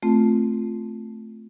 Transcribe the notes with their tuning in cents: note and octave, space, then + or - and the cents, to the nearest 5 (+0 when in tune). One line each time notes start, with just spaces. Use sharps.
A3 +0 C4 +0 F4 +0